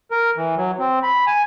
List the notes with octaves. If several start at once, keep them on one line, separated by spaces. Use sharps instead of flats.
A#4
E3
F#3
C4
B5
G#5